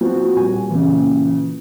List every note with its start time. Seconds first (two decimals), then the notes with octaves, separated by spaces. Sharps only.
0.01 F3 C4 F#4
0.36 D#1 G#5
0.70 A#2 C#3 E3